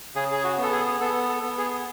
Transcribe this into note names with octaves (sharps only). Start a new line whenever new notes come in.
C#3 G#4
G#4
F#4
B3
A4
G#4
B3 A4
A4
B3
G#4